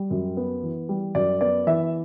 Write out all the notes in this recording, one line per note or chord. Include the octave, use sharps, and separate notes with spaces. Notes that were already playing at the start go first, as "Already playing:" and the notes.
Already playing: G3
F#2
B3
E3
G3
F#2 D5
B3 D5
E3 E5